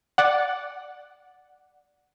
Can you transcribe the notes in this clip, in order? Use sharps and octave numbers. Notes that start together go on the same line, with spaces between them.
D5 F#5